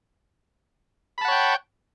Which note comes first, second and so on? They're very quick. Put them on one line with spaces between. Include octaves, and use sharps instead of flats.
B5 A5 F#5 C#5 G5